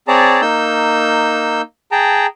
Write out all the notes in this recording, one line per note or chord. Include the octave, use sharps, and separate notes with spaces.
C4 G#4 C#5 D5 A5 A#5
A#3 D#4 E6 G6
G#4 G5 A5 A#5